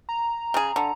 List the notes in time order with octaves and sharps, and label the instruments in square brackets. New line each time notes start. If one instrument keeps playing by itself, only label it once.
[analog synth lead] A#5
[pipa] C#3 G#4
D3